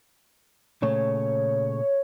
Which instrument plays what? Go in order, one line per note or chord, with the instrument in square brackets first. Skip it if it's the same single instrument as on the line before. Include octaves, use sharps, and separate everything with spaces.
[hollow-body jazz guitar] A#2 C#3 A3 [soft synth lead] C#5